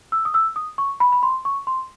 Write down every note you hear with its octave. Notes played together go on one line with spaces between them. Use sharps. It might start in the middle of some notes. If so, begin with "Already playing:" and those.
E6
D#6
E6
D#6
C#6
B5
B5
C6
C#6
C6